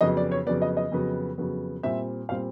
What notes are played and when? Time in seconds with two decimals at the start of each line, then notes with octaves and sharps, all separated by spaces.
0.01 F2 C#3 F#3 B3 D#5
0.17 D5
0.31 C#5
0.46 F2 C#3 F#3 B3 D5
0.62 D#5
0.77 D#5
0.92 F2 C#3 F#3 B3
1.38 F2 C#3 F#3 B3
1.83 A#2 G3 C4 E5
2.29 A#2 G3 C4 F5